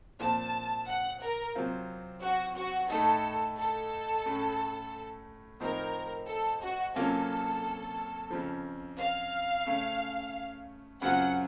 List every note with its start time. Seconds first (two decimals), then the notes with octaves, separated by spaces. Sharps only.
0.20 A#2 F3 C4 A5
0.87 F#5
1.22 A#4
1.55 C3 F#3 C4 F4
2.22 F#4
2.56 F#4
2.90 A2 A3 D#4 A4
3.58 A4
4.26 A2 A3 C#4
5.60 A2 F3 C4 D#4 A#4
6.28 A4
6.62 F#4
6.96 C3 F#3 A#3 C#4 F4 A4
8.30 F2 C#3 F3
8.98 F5
9.66 C#3 A3 C#4
11.02 F#2 C#3 F#3 C4 F4 F#5